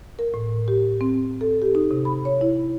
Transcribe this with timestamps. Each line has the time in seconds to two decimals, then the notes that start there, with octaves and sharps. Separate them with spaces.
0.19 A#4
0.34 A2
0.68 G4
1.01 C4
1.41 A4
1.62 G4
1.75 D#4
1.91 C3
2.05 B5
2.25 C#5
2.41 E4